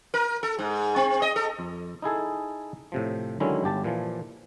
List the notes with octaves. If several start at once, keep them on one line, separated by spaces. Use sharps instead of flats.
A#4
A4
G#2
C4
D#5
A4
F2
D#4 E4 G#4 A4
A2 C3 F3
D3 D#3 F#3 G#3 C#4 E4
G1 G4 A5
A#2 E3 F3